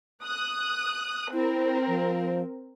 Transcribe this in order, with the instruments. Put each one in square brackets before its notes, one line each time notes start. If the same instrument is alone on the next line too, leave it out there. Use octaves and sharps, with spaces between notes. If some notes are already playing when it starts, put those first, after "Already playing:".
[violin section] D#6 F#6
[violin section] C4 A#4 [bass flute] E4
[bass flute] F3